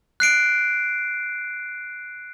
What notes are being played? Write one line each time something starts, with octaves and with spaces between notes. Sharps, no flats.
F#6 C7 D7